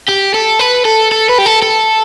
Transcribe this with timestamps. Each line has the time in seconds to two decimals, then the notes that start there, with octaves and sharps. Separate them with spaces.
0.08 G4
0.34 A4
0.59 B4
0.85 A4
1.11 A4
1.29 B4
1.38 G4
1.46 A4
1.62 A4